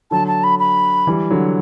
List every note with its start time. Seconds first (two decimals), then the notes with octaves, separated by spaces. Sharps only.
0.11 D3 F#3 A5
0.28 A5
0.44 B5
0.59 B5
1.07 E3 G3
1.30 D3 F#3